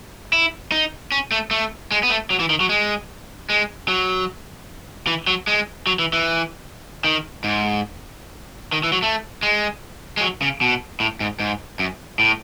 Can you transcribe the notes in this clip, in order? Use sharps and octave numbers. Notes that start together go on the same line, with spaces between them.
E4
D#4
C#4
A3
A3
G#3
B3
A3
F#3
E3
D#3
F#3
G#3
G#3
F#3
E3
F#3
G#3
F#3
E3
E3
D#3
G#2
D#3
E3
F#3
A3
G#3
G#3
F#3
C#3
B2
A2
G#2
G#2
F#2
A2